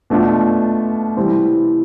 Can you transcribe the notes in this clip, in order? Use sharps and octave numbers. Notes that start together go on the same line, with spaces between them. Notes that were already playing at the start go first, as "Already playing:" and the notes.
B2 A3 D4 F4
C3 E3 G3 C4